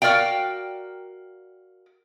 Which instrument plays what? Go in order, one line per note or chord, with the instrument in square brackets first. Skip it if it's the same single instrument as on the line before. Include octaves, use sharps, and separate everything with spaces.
[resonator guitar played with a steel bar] F#4 A#4 D5 F5 G5